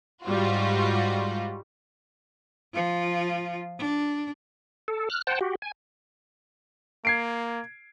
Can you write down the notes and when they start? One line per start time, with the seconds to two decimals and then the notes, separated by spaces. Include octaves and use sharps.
0.24 G#2 G3 F4 F#4
2.73 F3 F4
3.79 D4
4.88 A4
5.10 F6 F#6
5.27 C5 F#5 G5 A5
5.41 F#4 G4
5.62 G#5
7.05 A#3 G#6 C7 D7